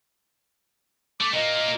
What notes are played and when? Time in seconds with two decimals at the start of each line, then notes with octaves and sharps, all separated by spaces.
1.21 A3 D6
1.34 A#2 A#3 D#5